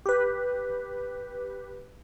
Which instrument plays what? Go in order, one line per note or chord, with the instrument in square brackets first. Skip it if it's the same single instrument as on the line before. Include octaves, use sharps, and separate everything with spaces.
[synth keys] G4 B4